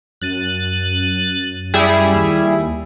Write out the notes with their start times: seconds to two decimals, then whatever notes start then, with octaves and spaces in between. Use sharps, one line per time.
0.22 F#2 F#6 A6 D#7
1.74 G3 E4 G#4
2.14 D#2